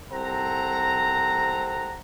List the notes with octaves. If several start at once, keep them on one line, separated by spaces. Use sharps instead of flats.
C2 C4 A4 F#5 A#5